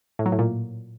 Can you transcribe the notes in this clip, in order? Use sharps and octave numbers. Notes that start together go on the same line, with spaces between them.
A2
F#3
A2
A#2